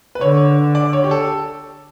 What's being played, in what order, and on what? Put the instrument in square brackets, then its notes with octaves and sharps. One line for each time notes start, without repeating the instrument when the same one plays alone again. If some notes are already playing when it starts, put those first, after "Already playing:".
[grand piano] B4
[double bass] D3 [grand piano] C#5
[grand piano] D5
C#5
G4
A4